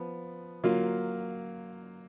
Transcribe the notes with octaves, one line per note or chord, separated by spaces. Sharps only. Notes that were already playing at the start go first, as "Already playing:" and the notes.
Already playing: F3 B3
F#3 A#3 F4